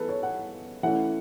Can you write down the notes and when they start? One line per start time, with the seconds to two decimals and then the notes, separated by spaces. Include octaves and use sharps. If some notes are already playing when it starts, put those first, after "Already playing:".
Already playing: E3 B3 G#4 A4 B4
0.09 C#5
0.23 F#5
0.83 E3 A3 C#4 F#5